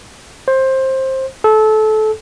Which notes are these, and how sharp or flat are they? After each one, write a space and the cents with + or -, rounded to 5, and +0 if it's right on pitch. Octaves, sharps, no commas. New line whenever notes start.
C5 +15
A4 -25